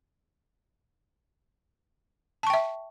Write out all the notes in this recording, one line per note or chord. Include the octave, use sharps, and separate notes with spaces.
E5 G5 A5 C#6